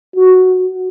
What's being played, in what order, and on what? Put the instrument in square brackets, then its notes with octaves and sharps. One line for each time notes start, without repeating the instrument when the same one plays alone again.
[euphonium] F#4